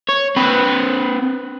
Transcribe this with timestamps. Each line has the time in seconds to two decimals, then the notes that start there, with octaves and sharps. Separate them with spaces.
0.09 C#5
0.36 C4 B4